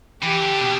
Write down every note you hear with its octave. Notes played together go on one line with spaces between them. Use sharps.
E3 G4
D3
B2